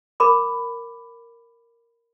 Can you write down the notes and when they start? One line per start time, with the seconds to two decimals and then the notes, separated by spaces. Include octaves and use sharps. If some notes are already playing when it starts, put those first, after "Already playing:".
0.20 A#4 B5 D6